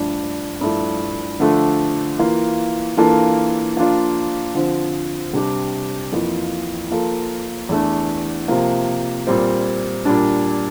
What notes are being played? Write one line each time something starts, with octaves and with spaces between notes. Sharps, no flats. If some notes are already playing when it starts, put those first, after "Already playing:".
Already playing: G2 F3 A3 D4
G2 F3 A3 E4 A4
D3 F3 A3 D4 A4
E3 A#3 F4
E3 A#3 D4 F4 A4
F3 A#3 D4 F4
D3 F3 C4
C3 G3 D4 G4
F2 E3 A#3 F4
F3 A#3 F4 A4
E2 E3 A3 D4
C3 F3 A#3
A#2 G3 C4
A#2 G3 D4